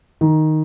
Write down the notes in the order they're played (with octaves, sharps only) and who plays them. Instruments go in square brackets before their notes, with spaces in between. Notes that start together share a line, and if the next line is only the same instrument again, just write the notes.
[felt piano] D#3